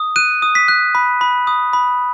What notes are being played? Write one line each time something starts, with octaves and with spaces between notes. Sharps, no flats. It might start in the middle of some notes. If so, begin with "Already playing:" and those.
Already playing: D#6
F#6 D#7
D#6
B6
F#6
B5
B5
D#6
B5